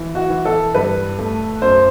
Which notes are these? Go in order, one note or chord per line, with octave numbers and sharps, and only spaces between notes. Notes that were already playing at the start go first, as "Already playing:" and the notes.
Already playing: E3
F#4
E3
A4
G2 B4
A3
F#2 C5